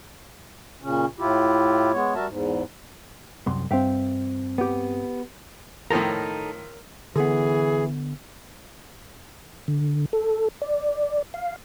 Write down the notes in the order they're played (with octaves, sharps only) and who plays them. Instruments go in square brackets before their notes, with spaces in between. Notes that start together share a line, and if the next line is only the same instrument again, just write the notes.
[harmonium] A#2 C#3 C#4
A2 E4 F4 G4
G#3 B3 C#5
G3 F#4 A#4 E5 A5
E2 G#2
[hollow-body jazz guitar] C2 F#2 C6
[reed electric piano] G2 C4 [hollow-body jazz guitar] E5 F5 G5
[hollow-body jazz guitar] B3 G4
[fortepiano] A2 D#3 F3 [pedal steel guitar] D#4 A4 A#5 [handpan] A#4 C#5
[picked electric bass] D3 B3 [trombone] E3 [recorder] G#4
[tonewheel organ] D3
A4
D5
F5